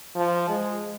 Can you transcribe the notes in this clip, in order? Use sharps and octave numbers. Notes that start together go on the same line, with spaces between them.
F3
G#3